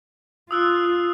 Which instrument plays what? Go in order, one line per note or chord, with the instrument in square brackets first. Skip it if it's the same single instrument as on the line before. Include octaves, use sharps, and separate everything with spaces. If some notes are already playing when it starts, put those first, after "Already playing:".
[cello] F4 [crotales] D#6 E6 F#6